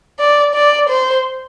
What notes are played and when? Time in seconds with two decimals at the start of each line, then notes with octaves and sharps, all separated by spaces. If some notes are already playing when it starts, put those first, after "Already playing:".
0.19 D5
0.54 D5
0.89 C5